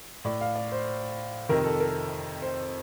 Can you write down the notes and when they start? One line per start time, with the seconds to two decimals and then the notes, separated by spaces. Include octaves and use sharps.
0.25 A2 D5
0.41 F5
0.56 D5
0.72 C5
1.49 F2 C3 D#3 A#4
1.64 A4
1.80 A#4
2.42 C5